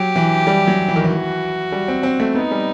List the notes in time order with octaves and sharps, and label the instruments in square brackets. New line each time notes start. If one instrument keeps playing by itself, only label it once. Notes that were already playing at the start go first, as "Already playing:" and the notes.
Already playing: [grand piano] F#3 [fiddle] G4
[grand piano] E3
G3
F#3
E3
D#3
E3
[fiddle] F#4
[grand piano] G3
C4
C4
A3
[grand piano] B3 [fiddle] D#4
[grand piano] G3